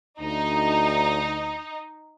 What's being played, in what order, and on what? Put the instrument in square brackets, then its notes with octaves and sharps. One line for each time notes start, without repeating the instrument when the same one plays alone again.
[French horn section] D2 [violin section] D#4